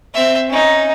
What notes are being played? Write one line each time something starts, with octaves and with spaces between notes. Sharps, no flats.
C4 E5
C#4 D#4